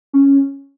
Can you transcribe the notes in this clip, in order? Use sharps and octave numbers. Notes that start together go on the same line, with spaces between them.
C#4